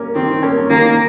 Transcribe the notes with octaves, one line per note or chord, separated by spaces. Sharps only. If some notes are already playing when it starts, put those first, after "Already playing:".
Already playing: A#3 C#4
D#3 C4
A#3 C#4
D#3 A#3